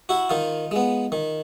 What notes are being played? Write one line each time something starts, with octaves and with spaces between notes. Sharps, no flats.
E4 F#4
D#3 D#4 F4
G#3 B3
D#3